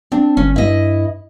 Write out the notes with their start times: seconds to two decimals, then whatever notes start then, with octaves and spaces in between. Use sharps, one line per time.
0.12 C4 D4
0.37 G1 C#4
0.56 G2 E4 D#5